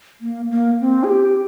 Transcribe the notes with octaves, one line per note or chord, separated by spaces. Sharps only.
A#3
A#3
C4
G#4
G4